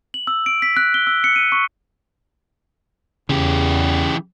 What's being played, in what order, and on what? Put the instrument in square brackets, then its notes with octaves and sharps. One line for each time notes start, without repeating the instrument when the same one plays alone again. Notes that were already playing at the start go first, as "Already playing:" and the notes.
[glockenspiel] F#7
E6
D7
B6
F#6
G7
E6
C#7
D#7
C#6
[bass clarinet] E2 [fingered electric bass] C#3 [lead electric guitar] E3 G4